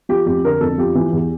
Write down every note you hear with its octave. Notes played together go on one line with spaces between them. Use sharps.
F3 G4
F2 G4
D3 A#4
F2 A4
F3 G4
E3
E2